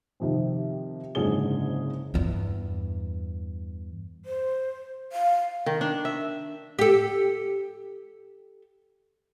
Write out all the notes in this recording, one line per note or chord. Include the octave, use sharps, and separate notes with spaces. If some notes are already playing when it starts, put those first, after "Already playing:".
C3 D#3 F3 C4
F#1 G#2 D3 C#4 G#4 G7
E2 G2
C5
F5
D#3
D4
E5
G4 A4